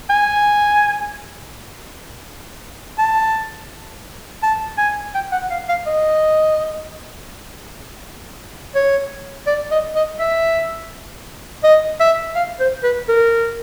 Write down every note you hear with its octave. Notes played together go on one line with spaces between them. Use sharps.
G#5
A5
A5
G#5
G5
F#5
F5
F5
D#5
C#5
D5
D#5
D#5
E5
D#5
E5
F5
C5
B4
A#4